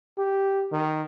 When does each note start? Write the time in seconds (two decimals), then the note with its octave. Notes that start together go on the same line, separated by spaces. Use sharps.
0.18 G4
0.72 D#3